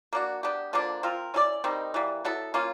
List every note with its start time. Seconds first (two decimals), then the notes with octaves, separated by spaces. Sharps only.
0.13 A#3 D4 F#4
0.43 B3 D4 G4
0.73 D3 F3 A#3 D4
1.03 C4 F4 A#4
1.34 C#4 E4 A4 D5
1.64 D#3 G3 C4 D#4
1.94 E3 G3 A#3
2.25 F#3 B3 E4 A4
2.54 A#3 C#4 F4